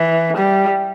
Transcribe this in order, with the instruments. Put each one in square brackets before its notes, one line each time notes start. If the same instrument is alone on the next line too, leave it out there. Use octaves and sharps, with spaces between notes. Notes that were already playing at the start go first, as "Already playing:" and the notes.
Already playing: [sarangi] E3
G3